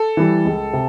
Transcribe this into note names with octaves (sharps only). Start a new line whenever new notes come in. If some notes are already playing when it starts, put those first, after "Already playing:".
Already playing: A4
E3 G3
C#2
C3